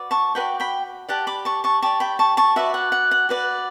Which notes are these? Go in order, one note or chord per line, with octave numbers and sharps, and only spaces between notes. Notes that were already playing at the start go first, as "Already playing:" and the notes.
Already playing: F#4 B4 D5
A5 C#6
F#4 B4 G5 B5
D5
G5 B5
G4 D5 F#5 A5
B5 D6
A5 C#6
A5 C#6
G4 D5 A5 C#6
G5 B5
A5 C#6
A5 C#6
F#4 B4 D5 E5
F#5
F#5
F#5
F#4 B4 D5